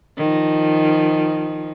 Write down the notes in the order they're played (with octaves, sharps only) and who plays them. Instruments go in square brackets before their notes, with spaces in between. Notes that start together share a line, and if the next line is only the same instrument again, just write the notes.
[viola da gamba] D#3 F3